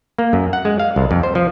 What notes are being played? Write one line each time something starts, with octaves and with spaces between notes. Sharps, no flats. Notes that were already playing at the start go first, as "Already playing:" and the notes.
A#3
F#2
F#5
G#3
F5
C2
F2
C5
F3